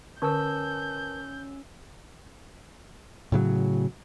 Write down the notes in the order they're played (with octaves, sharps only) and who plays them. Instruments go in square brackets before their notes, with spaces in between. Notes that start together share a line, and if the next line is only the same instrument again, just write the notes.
[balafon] D3 [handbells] C#4 E6 [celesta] A#4 B4 A5 [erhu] G6
[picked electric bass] A2 C#3 F#3